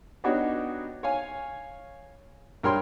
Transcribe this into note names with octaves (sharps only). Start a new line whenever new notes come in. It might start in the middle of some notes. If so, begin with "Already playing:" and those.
B3 D4 D#4 F#4 G4 C#5
C#5 F5 G#5
G2 A#4 C#5 G5 C6